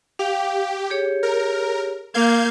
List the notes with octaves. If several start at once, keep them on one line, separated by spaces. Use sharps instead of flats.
G4 F5 G5
G4 G#4 C#5
A#4
A#3 F5 G6 G#6